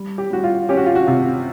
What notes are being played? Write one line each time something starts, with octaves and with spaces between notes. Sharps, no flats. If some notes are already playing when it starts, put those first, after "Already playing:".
Already playing: G3
G4
G3 F#4
F4
C#4 G4
F#4
F4
F#4
C3 F4